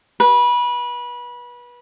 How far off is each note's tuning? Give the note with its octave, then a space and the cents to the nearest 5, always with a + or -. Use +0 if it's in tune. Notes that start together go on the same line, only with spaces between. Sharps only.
B4 -25